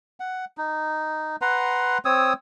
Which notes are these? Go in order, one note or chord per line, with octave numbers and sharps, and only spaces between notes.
F#5
D#4
B4 F#5 A#5 C6
C4 C#5 D#6 E6